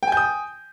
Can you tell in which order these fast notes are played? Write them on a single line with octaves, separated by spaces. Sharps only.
G5 G#5 G6 D#6